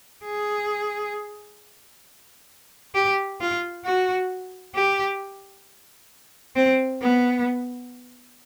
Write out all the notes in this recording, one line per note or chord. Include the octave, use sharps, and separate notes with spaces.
G#4
G4
F4
F#4
G4
C4
B3